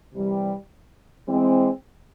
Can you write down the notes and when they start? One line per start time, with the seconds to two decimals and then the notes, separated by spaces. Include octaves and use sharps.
0.12 C3 E3 G3
1.28 E3 G#3 C4